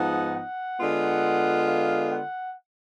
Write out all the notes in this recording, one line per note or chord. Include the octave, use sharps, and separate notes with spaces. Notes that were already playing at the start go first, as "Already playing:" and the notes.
Already playing: G#2 F3 B3 D#4 F#5
F#5
D3 G#3 B3 F4
F5
F#5